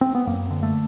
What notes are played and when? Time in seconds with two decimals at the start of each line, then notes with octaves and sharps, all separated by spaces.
0.01 C4
0.15 B3
0.27 F#2 A#3
0.51 D3
0.63 A3